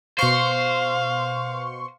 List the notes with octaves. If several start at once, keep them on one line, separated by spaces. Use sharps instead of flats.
B2 C5 F5 C6 C#6